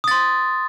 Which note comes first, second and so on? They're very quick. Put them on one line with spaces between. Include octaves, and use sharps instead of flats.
D#6 A6 C6